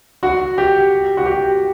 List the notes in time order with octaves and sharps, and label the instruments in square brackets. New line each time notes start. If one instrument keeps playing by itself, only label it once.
[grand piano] F#4
G4
F#4
G4